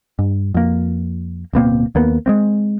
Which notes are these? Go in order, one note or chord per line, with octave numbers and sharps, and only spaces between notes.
G2
F2 A#3
D1 B2 A#3 C4
D#2 A#3 B3
G#3 A#3 C4